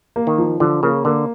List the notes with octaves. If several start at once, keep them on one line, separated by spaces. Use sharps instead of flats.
A#3
D#3
F3
D3 F3
C#3 A#3
D3 A#3